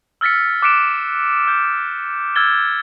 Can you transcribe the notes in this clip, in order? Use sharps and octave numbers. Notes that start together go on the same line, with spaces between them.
E6 F6 A6 B6 C#7
D6 F#6 B6 C#7 D7 E7
F6 G6
E6 F6 G#6 A6 G7